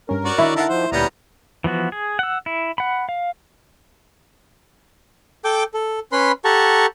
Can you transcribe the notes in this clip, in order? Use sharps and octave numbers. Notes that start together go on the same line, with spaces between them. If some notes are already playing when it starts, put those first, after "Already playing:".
G2 C#4 A#4
F#4 C#5 D5
D#3 D4 E4
D3 D#4 A#4 E5 F#5 A5
D#3 F3 C5
D2 A#2 G3 B3 C#4 A#5 G6
E3 F3 B3 F#4
G#4
F#5 E6
E4
F#5 B5
F5
A4 G5 D6 G6
A4
C#4 B4 B5 C6
G4 A4 F#5 A5 A#5 C#6